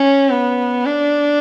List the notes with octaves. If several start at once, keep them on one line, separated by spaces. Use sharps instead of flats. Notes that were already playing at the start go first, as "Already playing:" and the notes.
Already playing: C#4
B3
D4